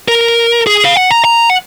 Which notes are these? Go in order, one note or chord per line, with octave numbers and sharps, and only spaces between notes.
A#4
G#4
F5
F#5
A#5
A#5
F#5